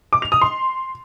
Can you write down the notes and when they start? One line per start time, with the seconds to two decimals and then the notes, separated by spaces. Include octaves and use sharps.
0.13 D6
0.22 F7
0.32 D#6
0.41 C6